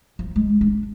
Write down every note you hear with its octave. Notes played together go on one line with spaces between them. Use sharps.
F3
G#3
D4